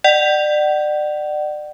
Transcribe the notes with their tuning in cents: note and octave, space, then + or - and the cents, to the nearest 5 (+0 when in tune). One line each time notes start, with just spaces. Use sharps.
D5 +35 F#5 +35